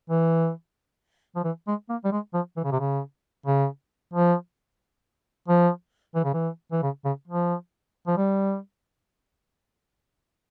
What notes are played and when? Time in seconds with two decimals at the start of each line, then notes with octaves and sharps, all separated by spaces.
0.10 E3
1.36 F3
1.44 E3
1.67 G#3
1.89 A#3
2.04 G3
2.12 G#3
2.34 F3
2.57 E3
2.64 C#3
2.71 C3
2.80 C#3
3.46 C#3
4.14 F3
5.48 F3
6.15 E3
6.25 C#3
6.34 E3
6.72 E3
6.83 C#3
7.05 C#3
7.28 F3
8.07 F3
8.17 G3